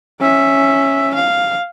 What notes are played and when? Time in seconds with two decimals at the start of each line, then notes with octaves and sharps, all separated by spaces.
0.20 C#4 E5
1.15 F5